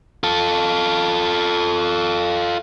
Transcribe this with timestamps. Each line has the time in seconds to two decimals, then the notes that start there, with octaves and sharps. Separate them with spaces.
0.24 F4 A4